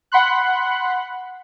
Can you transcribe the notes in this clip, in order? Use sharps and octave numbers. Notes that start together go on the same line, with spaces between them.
F#5 B5 C6 F#6